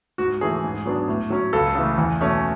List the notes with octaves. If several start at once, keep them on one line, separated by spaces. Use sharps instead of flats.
G#2 F#4
E3 A3 C#4 G#4
G#2
F#3 B3 D4
A2
F#3 C#4
C#2 A4
C#3 E3 A3
E2
B2 A3 C#4